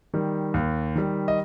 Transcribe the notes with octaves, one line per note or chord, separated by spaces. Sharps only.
D#3 G3
D#2
D#3 G3
D#5